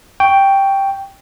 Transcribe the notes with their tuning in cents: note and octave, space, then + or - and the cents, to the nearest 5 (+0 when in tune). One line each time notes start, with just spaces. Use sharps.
G5 +0 C#6 +15